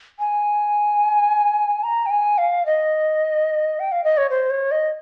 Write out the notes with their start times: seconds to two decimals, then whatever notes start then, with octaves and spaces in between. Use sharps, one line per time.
0.19 G#5
1.84 A#5
2.06 G5
2.11 G#5
2.38 F5
2.66 D#5
3.79 G5
3.92 F5
4.04 D#5
4.17 C#5
4.30 C5
4.50 C#5
4.71 D#5